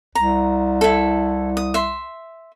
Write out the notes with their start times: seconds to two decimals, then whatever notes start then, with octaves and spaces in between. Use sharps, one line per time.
0.15 C2 A#5
0.81 E4 A4
1.57 D#6
1.74 E5 C6